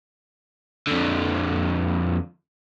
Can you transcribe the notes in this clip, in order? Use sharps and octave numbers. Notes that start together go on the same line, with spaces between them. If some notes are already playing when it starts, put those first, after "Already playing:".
F2 D3